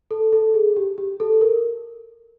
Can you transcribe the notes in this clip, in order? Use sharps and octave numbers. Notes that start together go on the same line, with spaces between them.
A4
A4
G#4
G4
G4
A4
A#4